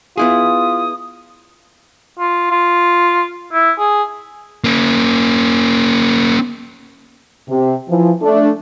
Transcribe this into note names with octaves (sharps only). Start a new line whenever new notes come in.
B3 E4 F4 G#4 D#6
F4
F4
E4
G#4
A#3 C#4
C3
E3 F3
A3 D4